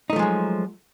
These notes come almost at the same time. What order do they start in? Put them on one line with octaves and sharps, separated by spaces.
D#4 A3 F3 G#3 F#3